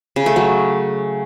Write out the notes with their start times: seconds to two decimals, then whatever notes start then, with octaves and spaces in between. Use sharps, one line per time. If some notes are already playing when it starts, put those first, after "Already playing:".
0.16 C#3
0.26 A3
0.36 F#3